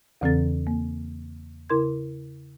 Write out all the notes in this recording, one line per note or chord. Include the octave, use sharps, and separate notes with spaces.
E2 C#3 E3 C4 A4 A6
A#3
C#3 E4 A#4 C6 G#6